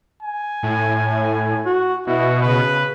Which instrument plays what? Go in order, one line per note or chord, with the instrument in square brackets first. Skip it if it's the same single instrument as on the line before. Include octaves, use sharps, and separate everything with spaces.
[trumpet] G#5
[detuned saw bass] A2
[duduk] F#4
[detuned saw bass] B2 [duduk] E4 [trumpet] F#4
[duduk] C#3 [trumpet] B4